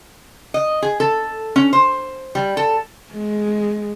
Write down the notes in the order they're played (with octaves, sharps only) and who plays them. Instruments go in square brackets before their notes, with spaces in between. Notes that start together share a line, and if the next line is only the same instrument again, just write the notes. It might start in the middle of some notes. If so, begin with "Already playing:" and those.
[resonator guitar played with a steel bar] D#5
G#4
A4
C#4
C5
G3
A4
[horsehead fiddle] G#3